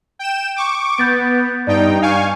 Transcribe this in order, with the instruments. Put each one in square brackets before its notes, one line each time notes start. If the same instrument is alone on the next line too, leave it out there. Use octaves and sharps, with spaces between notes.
[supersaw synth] G5 E7
C#6 D6
[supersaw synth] B3 [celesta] G6 A6 D7
[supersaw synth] G2 D#4 G5 [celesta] D5
[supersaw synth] F5 G#5 C#6